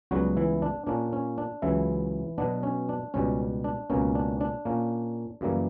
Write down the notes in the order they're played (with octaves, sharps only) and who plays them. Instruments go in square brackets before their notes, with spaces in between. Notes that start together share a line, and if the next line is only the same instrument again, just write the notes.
[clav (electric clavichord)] C#2 C#3 F#3 G3 B3 F#4
E3 E4
D4
A#2 A#3 C#4 D4
C#4
D4
C#2 C#3 E3 F#3 E4
B2 F#3 B3 D4
C#4
D4
C#2 B2 G3 C#4
D4
C#2 B2 A#3 C#4
D4
D4
A#2 A#3 C#4
F#2 C#3 E3 G3 A#3